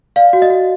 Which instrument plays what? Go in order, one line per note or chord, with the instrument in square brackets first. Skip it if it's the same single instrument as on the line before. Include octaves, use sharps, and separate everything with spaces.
[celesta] D5 F5
F#4
D#5
F#4